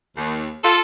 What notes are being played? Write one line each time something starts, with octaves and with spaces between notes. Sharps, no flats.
D#2
F4 A4